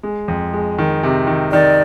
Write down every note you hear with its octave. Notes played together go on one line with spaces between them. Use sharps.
G#3
F2
G#3
D#3
C3
D#3
D#3 D5